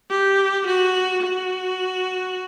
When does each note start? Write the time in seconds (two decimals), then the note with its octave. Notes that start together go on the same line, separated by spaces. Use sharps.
0.10 G4
0.66 F#4
1.23 F#4